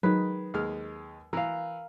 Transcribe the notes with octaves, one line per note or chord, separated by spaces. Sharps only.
D#3 F#3 G#3 D#4 B4
D#2 G#3 F6
E3 A#4 F5